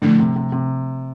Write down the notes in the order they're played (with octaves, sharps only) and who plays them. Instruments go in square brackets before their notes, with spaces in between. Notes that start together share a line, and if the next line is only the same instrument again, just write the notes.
[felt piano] A2 D3 [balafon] F3 A3 D4
[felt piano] C3
C3
C3